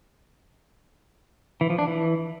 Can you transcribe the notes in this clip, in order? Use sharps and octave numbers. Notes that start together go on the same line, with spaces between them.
E3
F3
D4
E3